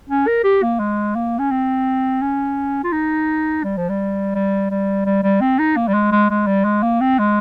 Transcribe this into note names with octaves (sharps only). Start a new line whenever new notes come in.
C#4
A#4
G4
A#3
G#3
A#3
C#4
C4
C#4
F4
D#4
G3
F3
G3
G3
G3
G3
G3
C4
D#4
A#3
G3
G#3
G#3
G#3
G3
G#3
A#3
C4
G#3